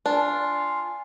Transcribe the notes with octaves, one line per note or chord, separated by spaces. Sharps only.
D4 F4 F5 G#5